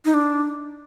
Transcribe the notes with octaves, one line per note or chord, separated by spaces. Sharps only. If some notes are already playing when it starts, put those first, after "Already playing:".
D#4
D4